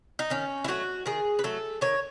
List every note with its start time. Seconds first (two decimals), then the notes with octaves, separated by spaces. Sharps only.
0.19 D#4
0.30 D#3 C#4
0.64 E4
0.68 F#3 A3 F#4
1.06 D#3 G#4
1.39 B4
1.44 F#3 A3 A4
1.81 D#3 C#5